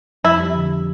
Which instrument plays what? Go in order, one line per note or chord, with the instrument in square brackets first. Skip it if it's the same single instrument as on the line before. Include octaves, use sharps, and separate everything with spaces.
[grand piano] F2 [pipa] E4
[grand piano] G3
D3